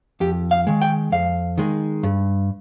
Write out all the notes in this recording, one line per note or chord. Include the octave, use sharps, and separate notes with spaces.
F2 G4
F5
D#3 G#3
G5
F2 F5
D#3 G#3
G2